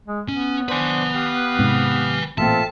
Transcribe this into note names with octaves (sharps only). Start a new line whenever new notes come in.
G#3
B3 C#4
D4 B4 C5 G#5
G4 F5
G#2 C3
A1 A#2 C4 F4 A4 E5 A5